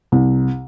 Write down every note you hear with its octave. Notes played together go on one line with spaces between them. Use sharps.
C2